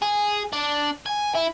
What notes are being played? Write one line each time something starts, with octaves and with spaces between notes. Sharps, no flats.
G#4
D4
G#5
E4